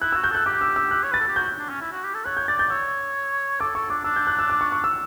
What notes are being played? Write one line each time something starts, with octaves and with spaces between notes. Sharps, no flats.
E4 F#6
E6
F#4
G6
A4 F#6
G4 D6
E6
E6
F#6
C#5
B4 A6
A4
G4
F#4 G6
D4
C#4
E4
F#4
G4
A4
C#5 F#6
G6
D5 A6
G6
C#5 E6
A4 D6
A4 C#6
D4 D6
D4 E6
G6
F#6
E6
D6
C#6
C#6
E6